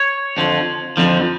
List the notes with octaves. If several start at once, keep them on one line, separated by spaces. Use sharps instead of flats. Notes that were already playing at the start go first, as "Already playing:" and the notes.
Already playing: C#5
F2 D3 F3
F2 D3 F3